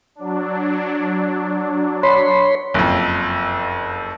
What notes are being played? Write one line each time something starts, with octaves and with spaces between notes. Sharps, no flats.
F#3 D4
C#5 B5 C6
F#1 F2